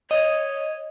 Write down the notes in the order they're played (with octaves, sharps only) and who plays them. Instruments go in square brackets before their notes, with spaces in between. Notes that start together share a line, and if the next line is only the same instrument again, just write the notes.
[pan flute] C#5 [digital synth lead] D#5